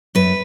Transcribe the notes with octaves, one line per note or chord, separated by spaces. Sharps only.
F#2 B4